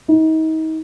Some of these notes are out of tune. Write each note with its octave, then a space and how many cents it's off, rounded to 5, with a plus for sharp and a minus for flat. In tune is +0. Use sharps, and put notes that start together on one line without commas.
D#4 +35